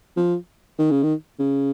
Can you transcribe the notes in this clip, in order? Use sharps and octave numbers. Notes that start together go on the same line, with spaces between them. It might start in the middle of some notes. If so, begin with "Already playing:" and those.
F3
D#3
C#3
D#3
C#3